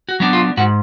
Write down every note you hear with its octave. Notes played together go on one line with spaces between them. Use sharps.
F#4
F#3 B3 D4
F4
G#2 F#4